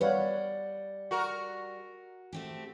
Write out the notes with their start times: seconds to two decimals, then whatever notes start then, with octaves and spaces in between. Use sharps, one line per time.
0.01 G3 B4 C#5 D5 F5 F#5
1.11 F#4 A#4
2.33 A3 C4 G4